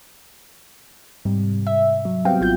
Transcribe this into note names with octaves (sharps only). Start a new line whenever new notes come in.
G#2 C3 G3
E5
F#3
G3 B3 C4 F#4 F5 G5
G#1 F4 G6